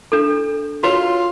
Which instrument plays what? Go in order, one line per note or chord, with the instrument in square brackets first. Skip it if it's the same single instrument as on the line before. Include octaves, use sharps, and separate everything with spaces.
[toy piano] D4 A4
[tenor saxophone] F4 [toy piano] F#4 B4 C#5